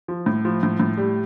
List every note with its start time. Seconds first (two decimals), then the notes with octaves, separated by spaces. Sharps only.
0.08 F3
0.26 A2
0.45 F3
0.63 A2
0.80 A2
0.97 G3